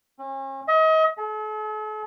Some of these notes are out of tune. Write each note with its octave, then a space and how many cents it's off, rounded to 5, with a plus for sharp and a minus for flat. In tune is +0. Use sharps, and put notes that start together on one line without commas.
C#4 -40
D#5 +35
A4 -45